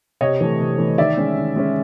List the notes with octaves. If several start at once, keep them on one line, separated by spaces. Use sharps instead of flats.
C3 C#5 D#5
E3 A3
C3
E3 A3
D#3 D5 E5
G#3 C#4
D#3
G#3 C#4